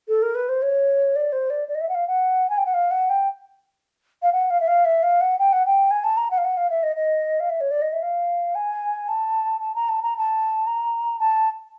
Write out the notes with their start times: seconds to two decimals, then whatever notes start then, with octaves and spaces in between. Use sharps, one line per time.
0.08 A4
0.22 A#4
0.35 B4
0.49 C5
0.62 C#5
1.15 D5
1.32 C5
1.50 D5
1.68 D5
1.75 D#5
1.80 E5
1.88 F#5
1.94 F5
2.07 F#5
2.49 G#5
2.57 G5
2.65 F#5
2.74 F5
2.91 F#5
3.09 G5
4.22 F5
4.32 F#5
4.50 F5
4.60 E5
4.67 F5
4.85 E5
5.02 F5
5.21 F#5
5.38 G5
5.52 F#5
5.66 G5
5.90 G#5
6.04 A5
6.17 A#5
6.30 F#5
6.37 F5
6.44 F#5
6.57 F5
6.70 E5
6.83 D#5
6.96 D#5
7.40 F5
7.49 E5
7.60 C#5
7.71 D5
7.81 D#5
7.92 E5
8.02 F5
8.55 G#5
9.08 A5
9.61 A5
9.75 A#5
9.88 A5
10.02 A#5
10.17 A5
10.67 A#5
11.19 A5